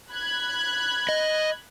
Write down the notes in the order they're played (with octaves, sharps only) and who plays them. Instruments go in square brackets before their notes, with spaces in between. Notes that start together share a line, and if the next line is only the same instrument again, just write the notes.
[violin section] B5 F#6 G#6
[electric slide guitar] D#5